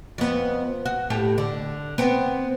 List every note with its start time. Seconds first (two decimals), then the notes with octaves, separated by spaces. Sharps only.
0.18 F2 B3
0.86 F#4
1.10 A2 G4 A4
1.38 D3
1.98 B3 C4